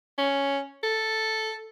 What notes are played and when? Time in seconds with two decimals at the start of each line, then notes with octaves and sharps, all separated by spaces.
0.18 C#4
0.83 A4